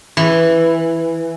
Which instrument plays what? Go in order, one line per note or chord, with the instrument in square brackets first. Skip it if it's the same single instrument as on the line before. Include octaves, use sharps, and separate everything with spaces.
[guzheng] E3